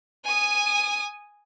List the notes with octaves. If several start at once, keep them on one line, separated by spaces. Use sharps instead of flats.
G#5 D#6